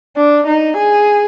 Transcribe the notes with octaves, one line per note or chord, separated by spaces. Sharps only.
D4
D#4
G#4